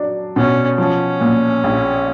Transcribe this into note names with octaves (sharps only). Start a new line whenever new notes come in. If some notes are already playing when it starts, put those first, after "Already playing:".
Already playing: F#3 D4
B2 C#4
F3 C#4
A#2
A#1